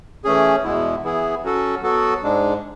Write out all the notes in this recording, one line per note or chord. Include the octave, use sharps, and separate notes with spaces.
E3 A3 C#4 G#4
E2 B2 G#3 B3 E4
E3 B3 E4 G#4
F#3 C#4 F#4 A4
F#3 B3 F#4 A4
G#2 G#3 D4